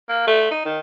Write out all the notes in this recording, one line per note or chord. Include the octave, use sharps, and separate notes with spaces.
A#3
A3
D#4
D#3